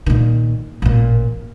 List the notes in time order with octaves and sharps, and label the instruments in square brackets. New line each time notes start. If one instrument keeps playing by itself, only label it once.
[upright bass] A#2 D#3
A1 A#2